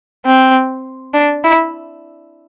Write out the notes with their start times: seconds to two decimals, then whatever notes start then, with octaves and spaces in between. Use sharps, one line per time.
0.26 C4
1.14 D4
1.44 E4